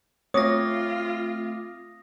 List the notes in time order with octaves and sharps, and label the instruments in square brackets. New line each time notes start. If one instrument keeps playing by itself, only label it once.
[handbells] A3 C4 D6 [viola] F4 [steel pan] C#5 [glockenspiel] D#6 A#6